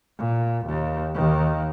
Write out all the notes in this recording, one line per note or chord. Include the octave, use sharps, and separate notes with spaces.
A#2
D#2
D#2 D#3